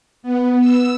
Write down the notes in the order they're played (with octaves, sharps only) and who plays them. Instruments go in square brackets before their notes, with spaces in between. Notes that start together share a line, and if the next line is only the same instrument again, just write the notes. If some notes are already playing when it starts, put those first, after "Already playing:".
[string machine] B3
E6